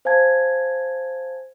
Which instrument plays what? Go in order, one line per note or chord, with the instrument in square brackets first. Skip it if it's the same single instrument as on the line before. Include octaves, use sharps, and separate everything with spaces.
[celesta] C5 F5 G#5 A5 G#6